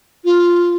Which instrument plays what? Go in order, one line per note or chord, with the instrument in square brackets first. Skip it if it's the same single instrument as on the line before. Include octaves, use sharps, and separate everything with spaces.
[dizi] F4